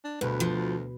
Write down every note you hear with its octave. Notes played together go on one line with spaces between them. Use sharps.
D4
D2 G2 B2 B4
F3